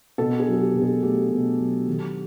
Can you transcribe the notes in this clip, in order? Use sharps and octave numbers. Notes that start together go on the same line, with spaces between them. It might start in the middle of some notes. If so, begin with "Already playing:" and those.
B2 A4
G#4
F#3
G#4
G4
B2
G#4
A3 G4
B2
F#3
D#3